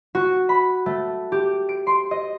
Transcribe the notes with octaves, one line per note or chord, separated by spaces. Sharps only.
F#4
B5
A3
G4
D7
C6
D#5